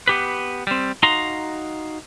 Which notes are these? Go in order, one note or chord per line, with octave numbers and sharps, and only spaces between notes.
B3 G4 B4
G3 C4
D#4 F#4 F5 A#5 C6